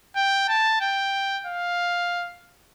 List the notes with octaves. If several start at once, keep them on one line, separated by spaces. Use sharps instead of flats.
G5
A5
G5
F5